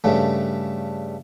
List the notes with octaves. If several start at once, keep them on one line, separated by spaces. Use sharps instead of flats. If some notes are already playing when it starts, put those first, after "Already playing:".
G2 C#3 A3